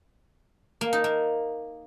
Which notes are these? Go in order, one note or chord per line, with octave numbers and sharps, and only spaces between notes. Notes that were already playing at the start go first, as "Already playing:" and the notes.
A#3
D#4
A#3